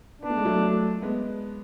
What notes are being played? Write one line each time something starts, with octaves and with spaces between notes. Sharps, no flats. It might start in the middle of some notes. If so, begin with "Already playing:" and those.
B3 D4
A3
G#3
F#3 A3
G#3 B3